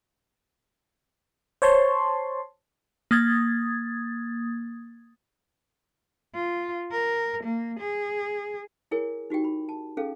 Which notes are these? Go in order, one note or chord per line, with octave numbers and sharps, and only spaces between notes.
C5 C#5 A5 C6
A#3 D#6 G#6 A6
F4
A#4
A#3
G#4
E4 G#4 A#4 C#5 G#5
D#4 F#4 G4 G5
B5
A5
C#4 G#4 A4 F5